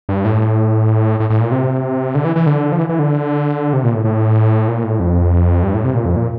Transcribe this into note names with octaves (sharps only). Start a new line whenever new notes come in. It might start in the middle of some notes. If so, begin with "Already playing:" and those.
G2
A2
A2
A2
A#2
C3
D3
E3
E3
D3
F3
E3
E3
D3
C3
A#2
A2
A2
A#2
A2
F2
G2
A2
C3
A#2
F2
A#2